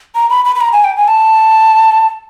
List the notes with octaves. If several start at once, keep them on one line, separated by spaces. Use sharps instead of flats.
A#5
B5
B5
B5
A#5
G#5
G5
G#5
A5